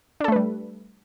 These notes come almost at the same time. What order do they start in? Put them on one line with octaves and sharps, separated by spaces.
D4 A4 A3 B4 G3